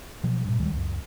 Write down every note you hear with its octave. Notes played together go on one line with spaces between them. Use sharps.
B2 F3 F#3
G2 A#2
D2 D#3 G3 G#3
C#2 F#2